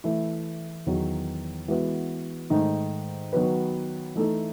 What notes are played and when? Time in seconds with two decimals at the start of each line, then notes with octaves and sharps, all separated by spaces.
0.04 E3 A3 E4
0.86 E2 D#3 F#3
1.68 E3 G#3 B3 F#4 B4
2.50 G#2 D#3 A3 D#4
3.33 D#3 F#3 B3 F#4 B4
4.15 E3 A3 D#4 A4